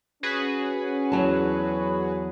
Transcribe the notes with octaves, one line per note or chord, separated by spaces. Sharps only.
C#4 F#4 G#4 B4
E2 F#3 A5